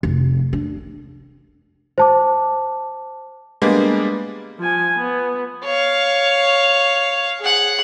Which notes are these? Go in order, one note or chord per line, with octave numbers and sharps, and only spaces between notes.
F1
D4
C5 A5 D6
G3 G#3 A#3 B3 D4
F3 G#5
B3
C#5 F5
G#4 F#5